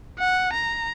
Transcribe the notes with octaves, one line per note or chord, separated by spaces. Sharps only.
F#5
A#5